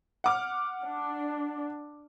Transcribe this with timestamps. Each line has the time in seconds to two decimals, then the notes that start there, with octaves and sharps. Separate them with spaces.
0.24 F#5 D6 F6
0.84 D4